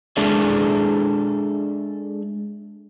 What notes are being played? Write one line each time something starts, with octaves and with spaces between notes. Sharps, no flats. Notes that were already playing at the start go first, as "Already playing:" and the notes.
G#3 D4 G#4 A4 D5 E5